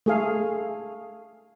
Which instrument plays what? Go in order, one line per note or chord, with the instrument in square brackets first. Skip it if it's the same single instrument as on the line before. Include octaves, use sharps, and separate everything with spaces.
[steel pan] A3 G#4 F5